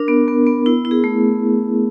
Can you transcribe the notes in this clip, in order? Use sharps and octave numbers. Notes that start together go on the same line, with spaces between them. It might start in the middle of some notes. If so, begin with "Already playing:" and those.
Already playing: D4 A#4
B3
B3
B3
E4
E4
G#4
A3